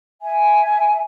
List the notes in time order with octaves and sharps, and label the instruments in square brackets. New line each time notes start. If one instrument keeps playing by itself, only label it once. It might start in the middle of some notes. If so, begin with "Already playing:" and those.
[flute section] E5 G#5